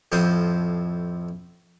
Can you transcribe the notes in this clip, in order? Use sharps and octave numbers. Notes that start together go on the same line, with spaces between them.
F2 A2 F3 C5 C6 D#6